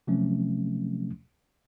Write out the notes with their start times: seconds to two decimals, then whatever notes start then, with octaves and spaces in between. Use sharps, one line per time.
0.07 C3 F3 F#3 A3 C4 C#4